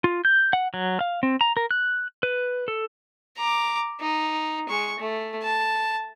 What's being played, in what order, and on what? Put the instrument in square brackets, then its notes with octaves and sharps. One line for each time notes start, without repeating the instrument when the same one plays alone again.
[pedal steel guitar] F4
G6
F#5
F#3
F5
C4
A#5
A#4
F#6
B4
A4
[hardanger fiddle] A#5 D6
D#4
G#3 C#6
A3
A5